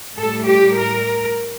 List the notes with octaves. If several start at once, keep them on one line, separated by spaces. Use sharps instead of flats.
A2 G3 A4
G4
A#4